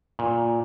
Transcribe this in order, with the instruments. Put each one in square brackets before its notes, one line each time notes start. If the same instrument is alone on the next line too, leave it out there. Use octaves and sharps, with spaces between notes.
[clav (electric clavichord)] A#2